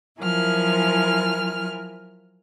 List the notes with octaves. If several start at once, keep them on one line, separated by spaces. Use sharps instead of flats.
F3 F#3 E4 A#4 G#5 F6